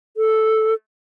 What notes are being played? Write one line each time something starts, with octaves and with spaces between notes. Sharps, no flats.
A4